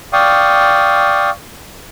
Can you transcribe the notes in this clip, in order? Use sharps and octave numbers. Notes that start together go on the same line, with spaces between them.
D5 F5 G5 C#6 D#6